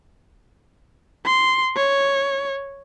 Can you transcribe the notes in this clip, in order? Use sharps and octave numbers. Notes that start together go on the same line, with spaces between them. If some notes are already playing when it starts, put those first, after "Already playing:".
C6
C#5